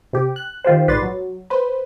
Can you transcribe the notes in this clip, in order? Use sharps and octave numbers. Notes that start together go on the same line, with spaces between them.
C3 G4
F#6
D#3 F4 G4 C5
A#1 G#2 B4 D5 C6 A6
F#3
B4 C5